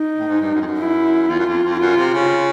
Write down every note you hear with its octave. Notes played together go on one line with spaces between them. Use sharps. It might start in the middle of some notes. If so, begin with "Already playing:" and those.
Already playing: D#4
A2
G#2
G2
F#2
F2
F#2
E4
E2 F4
F#2
F2
F2
F#2 F4
C3
C#3